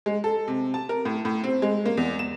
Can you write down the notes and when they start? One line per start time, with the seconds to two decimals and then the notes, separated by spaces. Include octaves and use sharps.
0.06 G#3
0.24 A4
0.48 C3
0.74 A5
0.89 A#4
1.05 A2
1.25 A2
1.44 C4
1.62 G#3
1.86 A#3
1.97 E2
2.19 E7